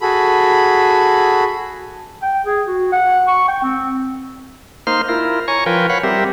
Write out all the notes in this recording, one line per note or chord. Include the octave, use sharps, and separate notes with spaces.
F#4 G#4 A4 B5
G5
G#4
F#4
F#5
C#6
G5
C4
A#3 D#4 C5 C6 F6
E4 F4 A#4
C#5 G#5 A#5 C#6
F3 F4 A#4 B4 G5 G#5
C#5 F5 F#5 B5
G3 C4 G4 A#4 E5